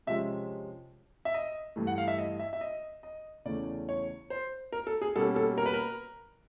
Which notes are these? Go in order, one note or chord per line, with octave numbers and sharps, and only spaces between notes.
C3 F3 G#3 C#4 E5
E5
D#5
G2 E3 A3
F#5
F5
E5
D#5
E5
E5
D#5
D#5
E2 C#3 E3 A3 C#4 D5
C#5
C5
A#4
A4
G#4
B2 G3 A#3 C#4 A4
A4
A#4
B4
A#4